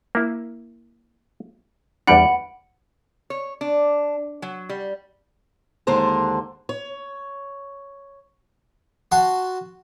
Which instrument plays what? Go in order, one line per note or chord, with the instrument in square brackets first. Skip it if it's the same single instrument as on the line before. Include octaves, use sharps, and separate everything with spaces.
[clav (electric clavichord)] A#3 E4
[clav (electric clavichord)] E2 G3 D4 [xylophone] F#5 B5 D7
[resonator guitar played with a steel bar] C#5
D4
F#3
G3
[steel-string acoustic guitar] D#2 D3 G#3 D4 C5 A#5
C#5
[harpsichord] F#4 A5 C6